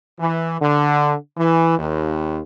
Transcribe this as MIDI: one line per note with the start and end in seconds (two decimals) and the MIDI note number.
0.19 0.60 52
0.61 1.14 50
1.37 1.76 52
1.79 2.41 39